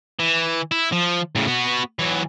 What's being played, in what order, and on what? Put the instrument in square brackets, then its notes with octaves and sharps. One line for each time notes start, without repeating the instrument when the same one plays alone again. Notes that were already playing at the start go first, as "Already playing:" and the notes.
[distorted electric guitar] E3
E4
F3
A2 C#3
B3 F#4
E3 F#3